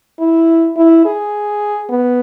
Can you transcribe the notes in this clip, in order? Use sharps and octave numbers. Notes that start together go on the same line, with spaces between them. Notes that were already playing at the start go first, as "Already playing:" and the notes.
E4
E4
G#4
B3